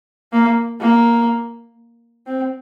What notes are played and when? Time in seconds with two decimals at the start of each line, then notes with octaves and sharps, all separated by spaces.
0.33 A#3
0.81 A#3
2.27 C4